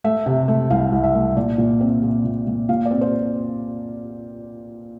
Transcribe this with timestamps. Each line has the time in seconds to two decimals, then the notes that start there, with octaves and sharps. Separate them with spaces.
0.04 A3 E5
0.26 C3
0.48 A3
0.70 C2 F5
0.92 C2
1.04 E5
1.15 A3
1.37 A#2 D5
1.58 A#2
1.81 C4
2.03 A#2
2.25 A#2
2.47 A#2
2.69 A#2 F5
2.86 D5
2.91 C4
3.01 C5